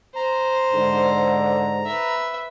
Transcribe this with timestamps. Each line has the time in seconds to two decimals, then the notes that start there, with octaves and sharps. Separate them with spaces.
0.16 C5 A#5
0.73 G#2 D3
1.86 B4 E5